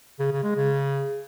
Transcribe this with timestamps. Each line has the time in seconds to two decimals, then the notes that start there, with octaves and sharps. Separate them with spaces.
0.20 C#3
0.32 C#3
0.44 G#3
0.56 C#3